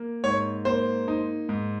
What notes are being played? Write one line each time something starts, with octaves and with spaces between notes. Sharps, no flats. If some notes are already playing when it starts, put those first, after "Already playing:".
Already playing: A#3
G#2 C#5
A#3 C5
D#4
G#2